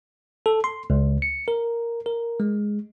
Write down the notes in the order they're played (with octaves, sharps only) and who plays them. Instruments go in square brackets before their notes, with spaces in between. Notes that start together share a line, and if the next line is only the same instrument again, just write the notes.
[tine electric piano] A4
C6
C#2
C#7
A#4
A#4
G#3